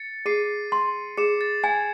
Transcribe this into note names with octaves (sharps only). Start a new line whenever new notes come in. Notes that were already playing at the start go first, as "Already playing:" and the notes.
Already playing: A6 C#7
G#4 C7 D#7
C6
G#4 C#7 E7
A6
G#5 G#6